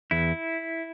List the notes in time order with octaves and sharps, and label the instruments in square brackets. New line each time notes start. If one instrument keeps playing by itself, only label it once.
[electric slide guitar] E2 E4